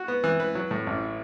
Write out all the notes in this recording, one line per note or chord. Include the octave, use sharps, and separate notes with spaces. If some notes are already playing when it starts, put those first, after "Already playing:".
Already playing: F#4
B3
E3
B4
F#3
A2
A1